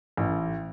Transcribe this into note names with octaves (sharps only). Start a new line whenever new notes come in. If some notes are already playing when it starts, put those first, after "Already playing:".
A1